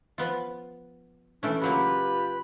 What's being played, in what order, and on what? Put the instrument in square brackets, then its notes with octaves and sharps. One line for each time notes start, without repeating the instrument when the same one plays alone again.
[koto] F3 B3 F4
[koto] E3 A3 C#4 [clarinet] D4
[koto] C#3 F#3 A#3 [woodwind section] F4 G4 B4 [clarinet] B5